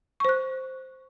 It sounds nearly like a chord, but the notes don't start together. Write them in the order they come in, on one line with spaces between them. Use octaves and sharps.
C#6 C5 F#6